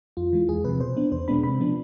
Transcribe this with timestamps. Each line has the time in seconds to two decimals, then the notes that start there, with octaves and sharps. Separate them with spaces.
0.17 F2 F4
0.33 E3 G#3
0.49 E2 G#4
0.64 C3 F3 B4
0.80 B2 C5
0.97 B3 D4
1.12 E2 C5
1.28 B2 G#3 B3 D4 B5
1.43 C3 B5
1.60 F3 B3 D4